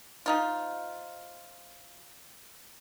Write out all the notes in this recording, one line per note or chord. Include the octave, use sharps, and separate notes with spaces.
F3 D#4 F4